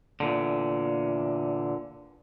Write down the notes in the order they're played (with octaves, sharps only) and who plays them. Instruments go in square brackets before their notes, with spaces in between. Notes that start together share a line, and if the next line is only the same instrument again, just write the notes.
[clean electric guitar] E2 A#2 D3